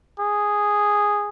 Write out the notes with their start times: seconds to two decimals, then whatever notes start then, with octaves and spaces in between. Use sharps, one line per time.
0.19 G#4